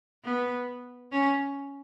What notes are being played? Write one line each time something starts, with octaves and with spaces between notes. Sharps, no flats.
B3
C#4